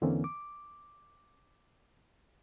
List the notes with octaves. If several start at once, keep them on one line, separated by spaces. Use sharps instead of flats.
E2 D3 E3 A#3 C4 C#4
D6